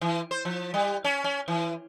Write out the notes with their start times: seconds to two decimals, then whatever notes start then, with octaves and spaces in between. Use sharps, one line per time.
0.01 E3
0.31 C5
0.45 F3
0.74 G3
1.04 C#4
1.24 C#4
1.48 E3